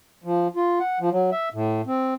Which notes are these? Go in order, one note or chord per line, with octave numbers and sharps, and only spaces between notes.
F3
F4
F#5
F3
F#3
E5
A2
C4